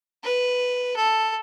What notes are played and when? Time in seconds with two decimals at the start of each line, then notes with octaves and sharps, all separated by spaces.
0.23 B4
0.96 A4